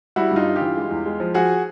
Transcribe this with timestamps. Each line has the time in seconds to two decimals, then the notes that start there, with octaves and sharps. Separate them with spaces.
0.16 G3 E4 F#4
0.31 G2
0.36 D#4 F4
0.46 G2
0.56 F4 G4
0.61 E3
0.76 G#3
0.91 E2
1.05 G#3
1.20 F3
1.34 F3 F#4 G#4